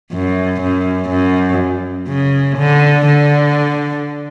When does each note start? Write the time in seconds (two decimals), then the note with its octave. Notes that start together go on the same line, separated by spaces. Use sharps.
0.13 F#2
0.62 F#2
1.10 F#2
2.08 C#3
2.58 D3
3.06 D3